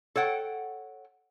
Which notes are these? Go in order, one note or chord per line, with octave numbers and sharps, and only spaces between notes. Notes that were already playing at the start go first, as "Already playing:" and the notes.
A4 C#5 F#5 G5